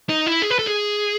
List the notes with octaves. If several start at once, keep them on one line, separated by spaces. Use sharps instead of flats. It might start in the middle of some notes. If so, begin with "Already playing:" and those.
D#4
E4
G#4
B4
A4
G#4